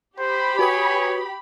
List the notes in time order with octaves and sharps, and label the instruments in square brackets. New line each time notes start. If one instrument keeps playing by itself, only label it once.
[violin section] G4 B5 [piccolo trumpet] C5
[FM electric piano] F#4 B4 D#6 [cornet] C#5 [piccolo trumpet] G#5